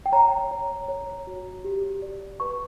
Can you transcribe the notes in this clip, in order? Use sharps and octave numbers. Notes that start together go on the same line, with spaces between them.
G5
C#5 A#5
C#5
C#5
F#4
G4
D5
B4 C#6